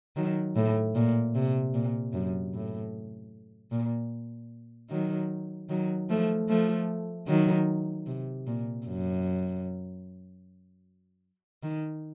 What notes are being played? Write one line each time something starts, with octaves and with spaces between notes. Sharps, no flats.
D#3 F#3
A2
A#2
C3
A#2
F#2
A2
A#2
D#3 F#3
D#3 F#3
F3 A3
F3 A3
D#3 F#3
C3
A#2
F#2
D#3